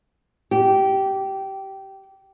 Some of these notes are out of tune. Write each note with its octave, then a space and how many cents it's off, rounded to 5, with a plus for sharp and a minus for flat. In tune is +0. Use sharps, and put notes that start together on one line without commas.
G4 -15